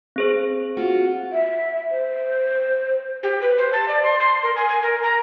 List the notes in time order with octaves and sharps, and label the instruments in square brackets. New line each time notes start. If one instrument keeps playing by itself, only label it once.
[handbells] C4 G#4 C5
[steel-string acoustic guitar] F4 F#4
[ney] E5
C5
[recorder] G4
B4
C5
A5
D5
C6
C6
A#4
G#5
G#5
A#4
A#5